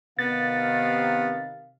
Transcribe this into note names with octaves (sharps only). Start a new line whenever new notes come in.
C3 D#3 B3 F5 A6